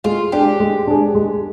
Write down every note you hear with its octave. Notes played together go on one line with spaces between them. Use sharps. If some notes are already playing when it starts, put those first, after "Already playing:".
G#3 F4
D4 G4 G#4
G#3
D4 G#4
G#3